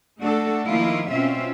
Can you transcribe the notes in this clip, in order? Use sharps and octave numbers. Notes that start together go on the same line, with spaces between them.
A3 D4 F#4 A4
D#3 F3 A#3 E4 F4
B2 C4 C#4 F4 E5